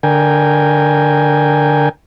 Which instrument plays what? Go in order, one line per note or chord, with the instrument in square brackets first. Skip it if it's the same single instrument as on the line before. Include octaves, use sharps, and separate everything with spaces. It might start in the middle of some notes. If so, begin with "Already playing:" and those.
[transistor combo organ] D3 A#4 G5 G#5